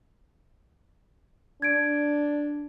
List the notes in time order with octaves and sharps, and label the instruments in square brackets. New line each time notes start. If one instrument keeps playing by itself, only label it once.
[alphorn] D4 [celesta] G#6 D7